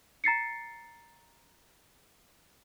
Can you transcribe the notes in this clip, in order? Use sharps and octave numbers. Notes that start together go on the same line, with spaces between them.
A#5 A6 C7 C#7